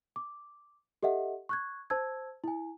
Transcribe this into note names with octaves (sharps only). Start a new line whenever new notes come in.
D6
G4 A4 D#5 E5 F#5
C#6 F#6 G#6
C5 A5 E6 G#6
E4 G#5